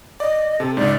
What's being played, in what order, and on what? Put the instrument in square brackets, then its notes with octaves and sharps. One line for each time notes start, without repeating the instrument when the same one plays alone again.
[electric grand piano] D5 [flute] D#5
[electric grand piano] C3 [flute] A4
[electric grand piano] C#2 G#2 [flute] D5